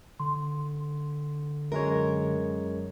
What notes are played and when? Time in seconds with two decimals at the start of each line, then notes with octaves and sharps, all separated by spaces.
0.20 D3 C6
1.72 F#2 G#3 A#4 C#5